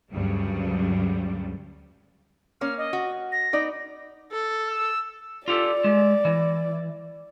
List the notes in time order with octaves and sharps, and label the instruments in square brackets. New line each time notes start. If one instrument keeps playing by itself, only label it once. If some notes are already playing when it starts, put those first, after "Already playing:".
[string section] D2 G2 C#3 F#3 G3
[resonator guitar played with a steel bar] A#3 C#4 [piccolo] F6
[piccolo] D#5
[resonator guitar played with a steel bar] F#4
[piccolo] A#6
[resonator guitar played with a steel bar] B3 D#4 D5
[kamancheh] A4
[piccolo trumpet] E6
[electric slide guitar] F4 G4 A4 [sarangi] D5
[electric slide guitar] G#3
E3